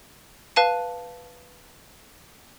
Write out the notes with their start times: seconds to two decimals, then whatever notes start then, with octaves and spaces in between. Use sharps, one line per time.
0.56 B4 F5 A5 D#7